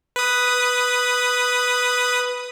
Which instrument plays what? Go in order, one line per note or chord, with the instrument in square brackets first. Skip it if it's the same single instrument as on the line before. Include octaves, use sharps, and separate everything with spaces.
[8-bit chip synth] B4 D#6